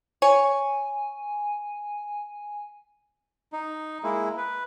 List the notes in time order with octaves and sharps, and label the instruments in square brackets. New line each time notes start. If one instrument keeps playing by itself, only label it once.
[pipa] C#5 [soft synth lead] G#5
[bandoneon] D#4
G#3 A#3 E4
B4